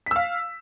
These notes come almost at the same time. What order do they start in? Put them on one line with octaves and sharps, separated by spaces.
B6 E6 F5